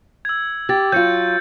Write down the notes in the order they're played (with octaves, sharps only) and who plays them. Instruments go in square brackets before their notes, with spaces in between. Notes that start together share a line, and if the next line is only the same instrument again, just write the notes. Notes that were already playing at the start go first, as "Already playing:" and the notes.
[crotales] E6 G#6
[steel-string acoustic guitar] G4 [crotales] G#6 A6
[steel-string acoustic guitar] F#3 F4 [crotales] G6 C#7